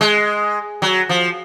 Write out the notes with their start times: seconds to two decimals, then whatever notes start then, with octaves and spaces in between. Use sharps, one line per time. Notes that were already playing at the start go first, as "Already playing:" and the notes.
0.01 G#3
0.82 F#3
1.09 F3